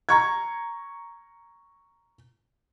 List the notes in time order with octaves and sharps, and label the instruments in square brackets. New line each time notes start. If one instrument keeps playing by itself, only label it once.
[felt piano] A#5 C#6 G#6